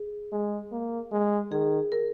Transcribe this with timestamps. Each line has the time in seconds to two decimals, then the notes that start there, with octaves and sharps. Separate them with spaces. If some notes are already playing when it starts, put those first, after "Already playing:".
Already playing: G#4
0.32 G#3
0.72 A#3
1.12 G#3
1.51 D#3 G#4
1.92 A#4